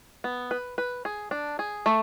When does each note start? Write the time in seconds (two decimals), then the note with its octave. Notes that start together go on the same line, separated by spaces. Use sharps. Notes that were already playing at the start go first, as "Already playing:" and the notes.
0.24 B3
0.51 B4
0.78 B4
1.05 G#4
1.31 D4
1.59 G#4
1.86 A3